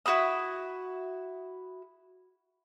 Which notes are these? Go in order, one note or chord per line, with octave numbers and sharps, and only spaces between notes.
E4 F#4 B5 D#6